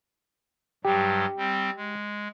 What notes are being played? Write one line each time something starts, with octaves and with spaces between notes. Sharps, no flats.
G2 F#3 G3 G4
G3 C4
G#3